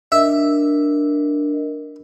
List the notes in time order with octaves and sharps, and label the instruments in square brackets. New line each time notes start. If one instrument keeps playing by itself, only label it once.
[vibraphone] D4 A#4 D#5 [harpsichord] E5